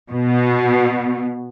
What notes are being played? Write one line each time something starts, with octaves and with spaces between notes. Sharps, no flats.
B2